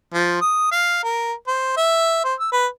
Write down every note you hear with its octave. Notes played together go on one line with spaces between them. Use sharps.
F3
D#6
F5
A#4
C5
E5
C5
E6
B4